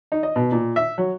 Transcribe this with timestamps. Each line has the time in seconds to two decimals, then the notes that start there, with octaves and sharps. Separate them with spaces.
0.12 D#4
0.23 D#5
0.36 B2
0.52 A#2
0.76 E5
0.98 F#3